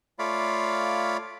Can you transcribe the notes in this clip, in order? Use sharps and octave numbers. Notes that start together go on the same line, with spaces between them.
A3 F4 C#5 D5 F5 B5